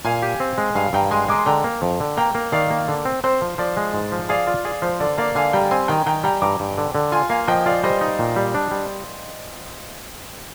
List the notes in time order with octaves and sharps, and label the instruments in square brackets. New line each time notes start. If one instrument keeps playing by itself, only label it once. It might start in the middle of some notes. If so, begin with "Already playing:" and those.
[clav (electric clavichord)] A#2 [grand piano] F5 G#5
[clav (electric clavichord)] G4
C4
G#3
[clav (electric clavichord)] G2 [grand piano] F5 G#5
[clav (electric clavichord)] G2 [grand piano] G5 A#5
[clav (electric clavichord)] G#3 [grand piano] G#5 C6
[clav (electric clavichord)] G#3 [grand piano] A#5 D6
[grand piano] C6
[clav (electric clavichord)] D3 [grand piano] G5 A#5
[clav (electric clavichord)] A#3
F2
D3
[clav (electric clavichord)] A#3 [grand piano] G5 A#5
[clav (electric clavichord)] A#3
[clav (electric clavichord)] D#3 [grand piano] D5 F5
[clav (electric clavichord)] A#3
D3
C4
[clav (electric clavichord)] C4 [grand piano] C5
[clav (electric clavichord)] F3
[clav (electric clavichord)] F3 [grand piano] D5
[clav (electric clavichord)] G#3
G#2
F3
[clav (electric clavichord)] G#4 [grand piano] D5 F5
[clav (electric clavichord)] F4 [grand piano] D5
[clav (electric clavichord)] G#4 [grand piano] D5
[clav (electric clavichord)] F3 [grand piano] C5
[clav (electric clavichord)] D3 [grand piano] D5
[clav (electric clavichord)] A#3 [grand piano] D5 F5
[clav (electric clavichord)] D3 [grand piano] F5 G#5
[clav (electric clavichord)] G3 [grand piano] G5 A#5
[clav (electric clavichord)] C4 [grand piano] G#5 C6
[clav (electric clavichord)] D#3 [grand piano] G5 A#5
[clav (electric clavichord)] D#3 [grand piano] G5 A#5
[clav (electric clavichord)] G3 [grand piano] G5 A#5
[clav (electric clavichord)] G2 [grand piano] A#5 D6
[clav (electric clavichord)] G2
D3
D3
[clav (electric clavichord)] F4 [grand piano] G#5 C6
[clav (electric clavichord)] A#3 [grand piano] F5 G#5
[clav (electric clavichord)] F3 [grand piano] D#5 G5
[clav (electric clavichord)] F4 [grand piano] D5 F5
[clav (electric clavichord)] G3 [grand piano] C5 D#5
[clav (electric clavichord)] D#4
A#2
G3
D4
G3